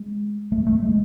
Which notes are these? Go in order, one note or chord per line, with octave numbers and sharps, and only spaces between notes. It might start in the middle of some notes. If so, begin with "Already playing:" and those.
Already playing: G#3
A3
A3
G#3